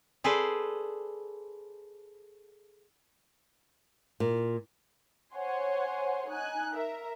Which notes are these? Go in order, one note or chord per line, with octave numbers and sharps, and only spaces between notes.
G#4 A4 B4 C5 D5
A#2
C5 C#5 F#5 G#5 C6
D#4 G#5 F#6
A#4 E5